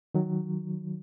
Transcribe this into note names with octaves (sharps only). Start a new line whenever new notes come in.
D#3 F#3